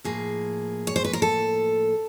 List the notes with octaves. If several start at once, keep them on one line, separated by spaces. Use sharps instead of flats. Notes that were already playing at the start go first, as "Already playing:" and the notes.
A2 F3 A#3 G#4
C#5
C5
B4
A#4
A4